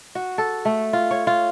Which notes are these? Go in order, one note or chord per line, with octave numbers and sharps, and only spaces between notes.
F#4
A4
A3
F4
C#5
F4